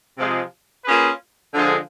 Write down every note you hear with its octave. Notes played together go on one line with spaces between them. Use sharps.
C3 F3 G#3
A#3 C#4 F4 G#4 B4
D3 F3 G#3